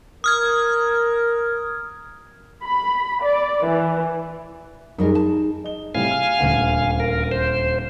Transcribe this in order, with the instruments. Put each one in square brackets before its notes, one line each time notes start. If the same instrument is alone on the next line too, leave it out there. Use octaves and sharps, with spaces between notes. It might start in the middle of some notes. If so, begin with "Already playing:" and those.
[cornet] A#4 [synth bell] D#6 F6 G#6
[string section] B5
D5
E3
[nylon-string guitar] F#2 G3 A#4 [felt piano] D#4 G#4
[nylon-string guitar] A5
[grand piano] D#5 G7
[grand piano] A2 C3 G3 [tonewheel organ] F5 G#5
[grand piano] F6
D#1 D2 F#5
[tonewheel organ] A#4
C5